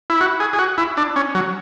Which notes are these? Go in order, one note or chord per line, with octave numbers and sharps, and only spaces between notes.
E4
F#4
G#4
G#4
F#4
E4
D4
C#4
F#3